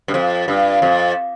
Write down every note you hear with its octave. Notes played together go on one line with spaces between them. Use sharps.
G2
F2
G2
F2